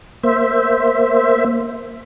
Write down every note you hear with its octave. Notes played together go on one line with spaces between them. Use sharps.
A#3 C5 E5